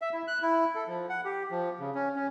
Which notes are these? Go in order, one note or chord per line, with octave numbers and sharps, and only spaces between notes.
E5
E4
F#6
E4
A4
F3
F#5
G4
F3
C#3
C#4
C#4